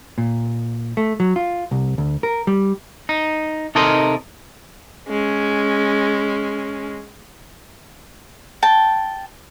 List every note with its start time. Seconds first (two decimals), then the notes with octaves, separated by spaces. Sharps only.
0.18 A#2
0.97 A3
1.20 F#3
1.36 F4
1.71 C2
1.98 D2
2.23 A#4
2.47 G3
3.09 D#4
3.75 C3 D#4 A4 A#4 D#5 C6
5.08 G#3 C#4
8.62 G5 A5